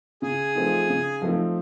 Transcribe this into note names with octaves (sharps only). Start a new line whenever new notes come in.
C#3 G#4
F3 A3 C4 D#4
C#3
F3 A3 C4 D#4